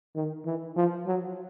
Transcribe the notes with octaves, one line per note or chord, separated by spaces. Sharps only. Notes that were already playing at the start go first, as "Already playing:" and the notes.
D#3
E3
F3
F#3